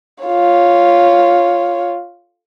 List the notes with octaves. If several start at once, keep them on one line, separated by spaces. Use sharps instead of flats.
F4 C#5